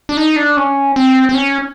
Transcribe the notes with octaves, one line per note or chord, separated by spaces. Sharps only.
D4
D#4
D4
C#4
C4
C4
C#4